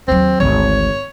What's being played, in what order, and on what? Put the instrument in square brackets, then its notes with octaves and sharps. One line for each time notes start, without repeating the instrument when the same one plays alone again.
[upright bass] D#2 F#3 [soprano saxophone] C4
[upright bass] G#1 D2 [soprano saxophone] C#5